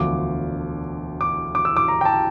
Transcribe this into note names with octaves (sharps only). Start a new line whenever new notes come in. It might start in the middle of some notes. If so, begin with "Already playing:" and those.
Already playing: E1 D2 D3 F3 D6
D6
D6
E6
D6
A#5
G5
A5